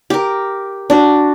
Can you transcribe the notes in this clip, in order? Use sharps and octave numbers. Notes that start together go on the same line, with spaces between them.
G4 A#4
D4 F#4